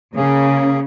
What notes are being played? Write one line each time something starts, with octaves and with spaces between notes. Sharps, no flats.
C#3 A#3 C#4 G#4